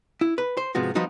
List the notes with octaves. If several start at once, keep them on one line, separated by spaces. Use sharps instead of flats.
E4
B4
C5
G#2 C3 F3 B3 F#4
F3 G3 B3 D#4 F#4